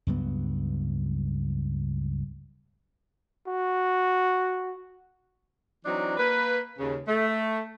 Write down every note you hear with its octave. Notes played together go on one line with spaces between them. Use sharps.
C#2 G2 F#3 B3
F#4
E3 F#3 C4 D4 D#4
A#3 B4
D#2 C#3
A3